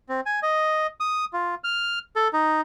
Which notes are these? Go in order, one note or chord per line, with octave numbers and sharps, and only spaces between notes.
C4
G#5
D#5
D#6
F4
F6
A4
D#4